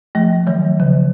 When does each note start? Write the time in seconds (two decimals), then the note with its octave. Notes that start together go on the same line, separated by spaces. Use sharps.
0.15 F3 A3
0.47 D#3 F#3
0.80 C#3 F3